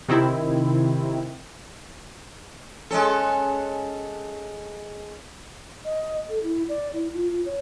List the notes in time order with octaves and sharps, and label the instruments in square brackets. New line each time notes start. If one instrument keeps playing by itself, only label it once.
[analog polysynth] C3 D#3 C4 E4
[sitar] G#3 C#4 A4
[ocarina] D#5
A4
E4
D5
E4
F4
F4
C#5